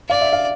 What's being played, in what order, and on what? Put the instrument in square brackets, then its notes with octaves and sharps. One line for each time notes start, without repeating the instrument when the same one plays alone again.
[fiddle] D5 [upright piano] F5
[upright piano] E5
F5